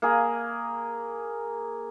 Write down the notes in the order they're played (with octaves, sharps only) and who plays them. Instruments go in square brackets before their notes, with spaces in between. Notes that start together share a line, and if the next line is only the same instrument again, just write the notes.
[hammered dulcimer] A#3 G#4